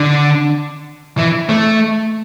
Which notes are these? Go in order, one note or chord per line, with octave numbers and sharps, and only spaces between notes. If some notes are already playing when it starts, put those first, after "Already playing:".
Already playing: D3
E3
A3